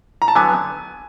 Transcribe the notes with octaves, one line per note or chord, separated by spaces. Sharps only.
A#5
A5
D3 F#3 B3 G#5